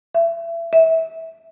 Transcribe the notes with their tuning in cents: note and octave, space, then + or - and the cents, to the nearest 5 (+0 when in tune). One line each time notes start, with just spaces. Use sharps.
E5 +30
E5 -25